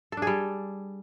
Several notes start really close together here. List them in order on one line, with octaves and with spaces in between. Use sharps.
A4 D4 G#4 G3